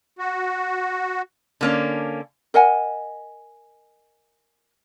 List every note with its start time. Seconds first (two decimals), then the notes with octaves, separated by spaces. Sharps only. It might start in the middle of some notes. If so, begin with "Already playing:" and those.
0.19 F#4
1.61 D3 A#3 C#4
2.54 A#4 D#5 F#5 G#5